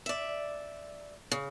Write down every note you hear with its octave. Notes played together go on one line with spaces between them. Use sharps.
D5 E5
C#3